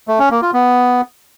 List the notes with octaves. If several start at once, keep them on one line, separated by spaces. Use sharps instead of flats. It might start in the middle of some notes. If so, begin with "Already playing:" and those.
A3
C#4
A#3
F4
B3